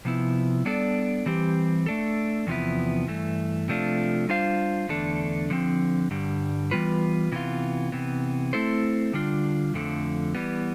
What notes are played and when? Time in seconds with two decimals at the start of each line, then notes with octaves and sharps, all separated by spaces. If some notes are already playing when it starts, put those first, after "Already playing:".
0.05 C3 F3 B3 E4
0.65 G3 B3 D4 A4 D5
1.26 E3 G3 C4 G4
1.86 A3 D4 A4
2.47 E2 C3 F3 B3 E4
3.08 G2 E3 A3
3.68 C3 F3 A3 D4 F4
4.29 G3 D4 F4 C5 F5
4.89 E2 D3 A3 D4 A4
5.50 D3 F3 C4
6.11 G2 D3 G3
6.71 E3 G3 B3 F4 B4
7.32 C3 E3 B3 F4
7.92 C3 E3 B3
8.53 A3 C4 E4 A4 C5
9.13 D3 G3 D4 F4
9.74 F2 D3 F3 A3
10.35 E3 G3 B3